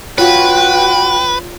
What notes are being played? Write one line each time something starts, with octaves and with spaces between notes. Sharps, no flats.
F4 F#4 B4 C#5 G5